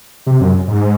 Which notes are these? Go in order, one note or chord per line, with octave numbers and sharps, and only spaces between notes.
C3
F#2
G#2